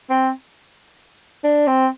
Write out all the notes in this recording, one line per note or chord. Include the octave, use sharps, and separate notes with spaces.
C4
D4
C4